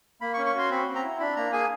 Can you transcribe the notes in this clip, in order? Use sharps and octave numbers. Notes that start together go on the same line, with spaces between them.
A#3 B5
C#6
C#4
C#6
F#4 C6
C4 B5
C4
A#5
E4
D4 B5
A#3 A#5
G#4 G#5